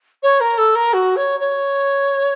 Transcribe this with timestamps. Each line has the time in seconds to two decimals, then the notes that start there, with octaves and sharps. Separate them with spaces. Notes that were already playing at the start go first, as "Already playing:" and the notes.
0.23 C#5
0.40 A#4
0.58 A4
0.75 A#4
0.93 F#4
1.16 C#5
1.40 C#5